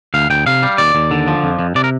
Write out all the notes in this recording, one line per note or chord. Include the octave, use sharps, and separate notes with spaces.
D2 F5
D2 G5
C3 F5
G3
D#2 D5
D#2
D3
F3
F2
F2
C3 D5
A#4